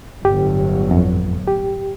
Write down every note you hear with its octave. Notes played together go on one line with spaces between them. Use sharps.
G1 A2 F#3 G4
F2
G4